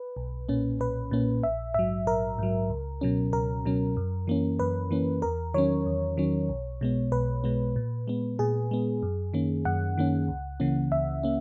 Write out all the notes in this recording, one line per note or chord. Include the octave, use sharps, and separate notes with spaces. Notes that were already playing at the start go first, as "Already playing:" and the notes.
Already playing: B4
B1
A#2 A#3 C#4
B1 B4
A#2 A#3 C#4
A#1 E5
G#2 F#3 E5
A#1 A#4
G#2 F#3
C#2
B2 F#3 C#4
C#2 A#4
B2 F#3 C#4
F#2
E3 A#3 C#4
F#2 B4
E3 A#3 C#4
E2 A#4
D#3 F#3 C#4 C#5
E2
D#3 F#3 C#4
B1
B2 G#3 B3
B1 B4
B2 G#3 B3
A#2
G#3 B3
A#2 G#4
G#3 B3
F#2
D#3 A#3 C#4
F#2 F#5
D#3 A#3 C#4
C#2
C#3 E3 A#3 C#4
C#2 E5
A#3 C#4